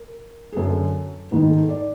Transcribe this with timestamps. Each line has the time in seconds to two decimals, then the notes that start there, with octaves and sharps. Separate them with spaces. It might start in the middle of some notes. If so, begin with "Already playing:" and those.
Already playing: A#4
0.52 G#4
0.56 F#2 D3 A4
1.31 G#2 D#3 B4
1.49 A4
1.69 D5